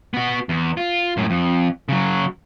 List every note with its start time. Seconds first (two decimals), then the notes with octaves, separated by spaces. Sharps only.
0.14 B3 F#4
0.49 E2
0.77 F4
1.17 F#2 A2
1.30 F2
1.89 C#3 F#3